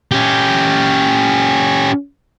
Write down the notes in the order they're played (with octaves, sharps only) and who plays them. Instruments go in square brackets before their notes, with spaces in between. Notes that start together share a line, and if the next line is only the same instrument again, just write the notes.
[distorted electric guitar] C#4 G4